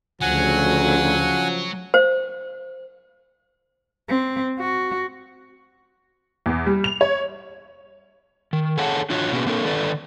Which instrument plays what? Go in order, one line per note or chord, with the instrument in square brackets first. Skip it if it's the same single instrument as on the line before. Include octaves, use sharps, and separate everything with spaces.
[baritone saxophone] D2 [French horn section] C#3 F3 [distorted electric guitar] F#3 [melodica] F#5 G#5
[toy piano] C5
[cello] C4
F#4
[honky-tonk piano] E2
G3
F7
C#5
[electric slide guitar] D#3
G#4 A4 C#5 F#5 G#5 A5
D4 F4 F#4 C#5
B2 A#3 C#4 F#4 G#4 B4
A#3 C4 D4 A4 A#4 C#5
D3 D#3 A4 B4 D5